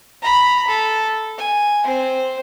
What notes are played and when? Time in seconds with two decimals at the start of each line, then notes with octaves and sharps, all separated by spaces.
0.23 A#5 B5
0.68 A4
1.38 G#5
1.85 C4 C5